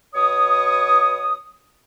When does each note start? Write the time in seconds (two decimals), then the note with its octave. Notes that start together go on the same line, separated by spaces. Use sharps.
0.14 B2 C#5 D#6